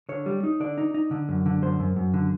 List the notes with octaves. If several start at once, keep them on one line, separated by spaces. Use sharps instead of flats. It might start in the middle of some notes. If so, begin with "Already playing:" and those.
D3 C#5
G3
D#4
D3 D5
D#4
D#4
D3
F#2
D3
F#2 C5
F#2
F#2
D3